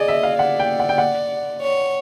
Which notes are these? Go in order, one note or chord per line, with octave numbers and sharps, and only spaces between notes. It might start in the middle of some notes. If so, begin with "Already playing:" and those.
Already playing: G#4 D5 D#5
E5
F5
D5 F#5
G5
F#5
G5
F#5
C#5